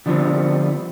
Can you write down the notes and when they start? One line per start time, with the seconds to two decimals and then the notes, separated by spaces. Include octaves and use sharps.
0.06 D3 F3 G3 A3 B3 C4